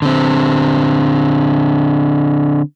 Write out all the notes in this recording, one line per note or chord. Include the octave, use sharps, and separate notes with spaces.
D3 C4